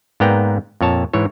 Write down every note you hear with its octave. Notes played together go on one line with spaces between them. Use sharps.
G#2 A#3 B3 D5 G5 A#5
F2 A#2 C#5 A5
G#2 E3 C#5